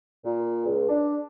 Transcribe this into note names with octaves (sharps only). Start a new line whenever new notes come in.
A#2
C#2
D4